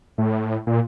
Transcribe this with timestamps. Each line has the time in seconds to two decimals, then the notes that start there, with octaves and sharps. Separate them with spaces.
0.18 A2
0.67 A#2